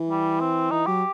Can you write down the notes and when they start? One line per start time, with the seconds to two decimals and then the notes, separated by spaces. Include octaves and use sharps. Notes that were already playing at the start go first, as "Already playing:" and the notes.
Already playing: E3
0.10 G3
0.40 C4
0.71 E3 D#4
0.86 F#3 G4